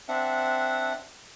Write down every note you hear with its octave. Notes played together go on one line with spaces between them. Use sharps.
C4 D4 E5 F#5